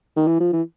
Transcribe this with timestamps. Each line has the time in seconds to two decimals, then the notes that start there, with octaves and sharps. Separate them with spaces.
0.17 D#3
0.27 E3
0.40 F3
0.53 E3